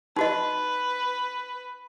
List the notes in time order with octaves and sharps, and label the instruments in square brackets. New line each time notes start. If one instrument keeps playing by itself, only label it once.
[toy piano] D#4 F#4 D#5 [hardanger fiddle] B4